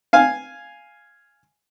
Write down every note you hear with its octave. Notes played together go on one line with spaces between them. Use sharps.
F5 G#5